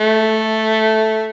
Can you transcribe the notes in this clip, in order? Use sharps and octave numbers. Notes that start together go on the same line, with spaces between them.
A3